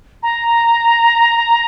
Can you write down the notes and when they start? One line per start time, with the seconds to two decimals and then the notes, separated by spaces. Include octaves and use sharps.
0.23 A#5